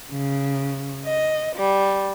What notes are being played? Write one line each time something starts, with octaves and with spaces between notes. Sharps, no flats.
C#3
D#5
G3